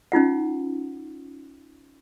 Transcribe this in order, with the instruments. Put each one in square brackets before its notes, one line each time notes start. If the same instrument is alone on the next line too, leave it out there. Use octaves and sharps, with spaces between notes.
[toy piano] C#4 D#4 F4 F#5